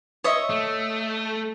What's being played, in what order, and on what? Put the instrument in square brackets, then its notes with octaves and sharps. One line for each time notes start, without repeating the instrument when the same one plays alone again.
[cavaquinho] C#5 D#5 E5
[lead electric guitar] A3